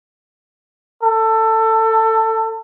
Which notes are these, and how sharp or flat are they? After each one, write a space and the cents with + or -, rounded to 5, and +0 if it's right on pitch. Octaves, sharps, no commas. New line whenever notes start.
A4 +20